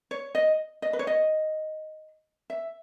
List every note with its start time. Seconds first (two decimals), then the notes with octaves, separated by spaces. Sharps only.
0.11 C#5
0.35 D#5
0.82 D#5
0.93 B4
0.99 C#5
1.07 D#5
2.50 E5